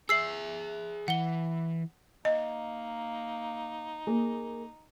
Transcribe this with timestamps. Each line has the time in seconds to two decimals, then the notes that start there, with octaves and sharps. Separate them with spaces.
0.09 G#4 E5 E6 C7 F#7
1.08 E3 F#5 G7
2.25 A#3 D#4 D#5
4.07 A#3 G#4